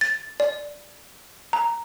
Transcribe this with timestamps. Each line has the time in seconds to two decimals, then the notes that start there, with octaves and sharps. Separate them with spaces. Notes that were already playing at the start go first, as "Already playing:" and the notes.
0.01 A6
0.40 D5
1.53 A#5